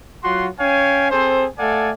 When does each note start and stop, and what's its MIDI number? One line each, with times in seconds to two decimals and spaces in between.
0.24 0.48 54
0.24 0.48 65
0.24 0.48 66
0.24 0.48 78
0.24 0.48 84
0.60 1.08 61
0.60 1.08 73
0.60 1.08 77
0.60 1.08 79
0.60 1.08 80
1.11 1.47 60
1.11 1.47 68
1.11 1.47 69
1.11 1.47 72
1.59 1.91 57
1.59 1.91 69
1.59 1.91 74
1.59 1.91 77
1.59 1.91 78
1.59 1.91 80